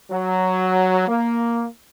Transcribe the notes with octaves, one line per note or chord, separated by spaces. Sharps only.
F#3
A#3